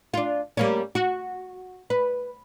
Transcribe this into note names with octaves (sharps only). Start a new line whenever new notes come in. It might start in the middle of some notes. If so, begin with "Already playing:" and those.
D4 F4
G3 A#3 C#4
F#4
B4